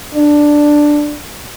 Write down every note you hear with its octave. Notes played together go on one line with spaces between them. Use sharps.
D4